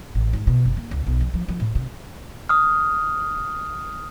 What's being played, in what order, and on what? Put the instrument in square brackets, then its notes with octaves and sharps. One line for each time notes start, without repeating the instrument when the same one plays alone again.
[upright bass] A1
G#2
B2
F#1
A#3
C#2
B1
F3
F3
F3
A2
C3
[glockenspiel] D#6 F6